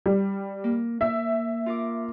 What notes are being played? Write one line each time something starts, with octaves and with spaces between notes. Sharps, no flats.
G3
A#3
A#3 E5
F4 A#4 D6